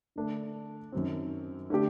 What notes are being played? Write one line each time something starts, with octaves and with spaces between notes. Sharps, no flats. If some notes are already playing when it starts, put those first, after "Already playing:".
D3 A3 D4 A4
F#2 D#3 F#3 C4
D3 A3 D4 G4